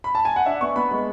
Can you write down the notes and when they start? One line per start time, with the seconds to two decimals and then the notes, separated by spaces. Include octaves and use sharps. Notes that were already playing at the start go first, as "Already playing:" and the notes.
0.04 B5
0.15 A5
0.25 G#5
0.36 F#5
0.46 D4 E5
0.61 B3 C#6
0.76 B3 B5
0.91 G#3